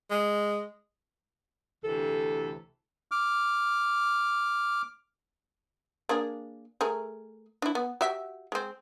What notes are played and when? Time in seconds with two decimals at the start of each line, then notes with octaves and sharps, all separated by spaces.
0.11 G#3
1.84 D2 C3 E3 A4
3.11 D6 F6
6.09 A#3 D4 G#4
6.81 A3 G#4 A#4
7.62 D4 E4
7.75 B3
8.01 F#4 G4 E5
8.52 G#3 C4